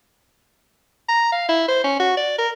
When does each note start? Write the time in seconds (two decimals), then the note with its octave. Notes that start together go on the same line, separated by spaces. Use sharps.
1.09 A#5
1.32 F5
1.48 E4
1.68 C5
1.84 C#4
1.99 F#4
2.17 D5
2.38 A#4